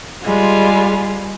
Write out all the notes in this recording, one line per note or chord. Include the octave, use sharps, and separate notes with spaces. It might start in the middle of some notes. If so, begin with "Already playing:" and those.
G3 G#3 F4